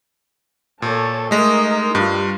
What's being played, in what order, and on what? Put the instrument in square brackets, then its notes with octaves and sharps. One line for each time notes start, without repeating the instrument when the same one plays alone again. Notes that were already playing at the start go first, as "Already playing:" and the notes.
[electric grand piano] A#2 [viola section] A4 C#5 A5
[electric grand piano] G#3 A3 [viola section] D#4 A#4 D#5
[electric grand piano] G2 [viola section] G3 F4